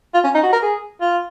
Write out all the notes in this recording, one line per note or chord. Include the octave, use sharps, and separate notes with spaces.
F4
C#4
D#4
F#4
A#4
G#4
F4